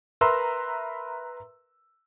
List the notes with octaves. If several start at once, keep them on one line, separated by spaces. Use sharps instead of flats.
A#4 B4 E5 A#5 C6 E6